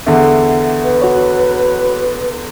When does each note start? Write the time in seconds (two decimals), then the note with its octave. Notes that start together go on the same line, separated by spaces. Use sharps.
0.07 E2 D3 E5 F#5
0.83 B4
1.02 F#4 C#5